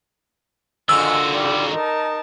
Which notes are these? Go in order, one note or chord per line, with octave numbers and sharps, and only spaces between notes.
G#2 D3 D#3 F4 F#4 E6
G3
D#4 A#4 A5